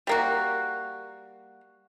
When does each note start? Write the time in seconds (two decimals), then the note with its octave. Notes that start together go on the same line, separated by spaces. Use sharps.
0.07 G3 A#3 F#4